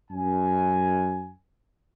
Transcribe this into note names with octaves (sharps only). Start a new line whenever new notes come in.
F#2 G#5